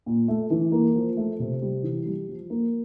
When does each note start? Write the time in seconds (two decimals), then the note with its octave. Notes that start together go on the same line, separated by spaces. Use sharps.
0.06 A#2
0.28 A3
0.50 E3
0.72 A#3
0.95 F3
1.17 A3
1.39 C3
1.62 G3
1.83 E3
2.06 G3
2.28 F3
2.50 A#3